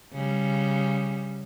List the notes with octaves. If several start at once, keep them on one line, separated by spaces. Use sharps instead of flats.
C#3 G3